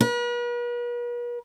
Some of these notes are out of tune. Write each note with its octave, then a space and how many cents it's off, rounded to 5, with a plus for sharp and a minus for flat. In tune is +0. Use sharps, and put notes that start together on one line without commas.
B4 -45